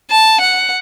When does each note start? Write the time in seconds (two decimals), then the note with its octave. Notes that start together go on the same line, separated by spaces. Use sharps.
0.10 A5
0.40 F#5